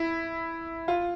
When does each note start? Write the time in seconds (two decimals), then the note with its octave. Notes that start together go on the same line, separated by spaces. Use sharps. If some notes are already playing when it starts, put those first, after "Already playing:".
Already playing: E4
0.88 F4